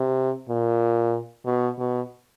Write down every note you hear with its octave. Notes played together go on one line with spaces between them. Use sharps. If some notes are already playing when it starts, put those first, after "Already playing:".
Already playing: C3
A#2
B2
B2